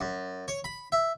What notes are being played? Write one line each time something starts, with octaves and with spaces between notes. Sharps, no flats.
F#2
C#5
B5
E5